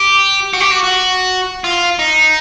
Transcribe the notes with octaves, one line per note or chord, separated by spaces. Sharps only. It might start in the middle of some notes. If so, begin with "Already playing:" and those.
Already playing: G4
F#4
G4
F#4
F#4
F4
D#4